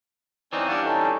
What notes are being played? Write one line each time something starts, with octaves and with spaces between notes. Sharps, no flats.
E3 C4 C#4 D#4 D5
E3 G3 D4 D5 F5 F#5
C#4 D#4 A4